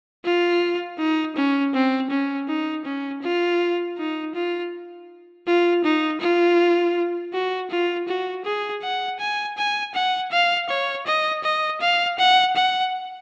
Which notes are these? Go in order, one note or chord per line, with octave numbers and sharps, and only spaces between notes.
F4
D#4
C#4
C4
C#4
D#4
C#4
F4
D#4
F4
F4
D#4
F4
F#4
F4
F#4
G#4
F#5
G#5
G#5
F#5
F5
C#5
D#5
D#5
F5
F#5
F#5